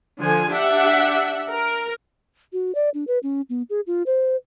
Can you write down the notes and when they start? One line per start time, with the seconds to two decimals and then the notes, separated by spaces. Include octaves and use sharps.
0.19 D3 F3 G#5
0.51 D4 G4 E5 F#5
1.49 A#4
2.53 F#4
2.75 D5
2.94 D4
3.07 B4
3.23 C#4
3.50 B3
3.70 G#4
3.87 F4
4.06 C5